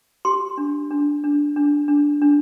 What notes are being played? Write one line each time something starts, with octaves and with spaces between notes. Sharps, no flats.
G4 C6
D4
D4
D4
D4
D4
D4